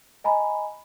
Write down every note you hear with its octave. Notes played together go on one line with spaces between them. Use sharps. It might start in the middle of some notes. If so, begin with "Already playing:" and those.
D#5 G#5 A#5 B5